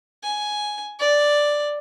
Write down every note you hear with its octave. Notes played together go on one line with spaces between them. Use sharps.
G#5
D5